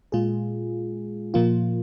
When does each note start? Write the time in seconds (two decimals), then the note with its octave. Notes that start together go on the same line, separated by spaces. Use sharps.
0.12 A#2 G#3 F4 G#4
1.34 A#2 F3 A#3 F4